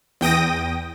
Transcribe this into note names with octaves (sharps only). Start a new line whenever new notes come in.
E2 G5 D#6 A#6